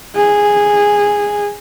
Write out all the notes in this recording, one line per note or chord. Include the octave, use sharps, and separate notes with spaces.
G#4